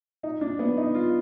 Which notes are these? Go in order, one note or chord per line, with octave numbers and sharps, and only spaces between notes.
D#4
D4
B3
D#4
F4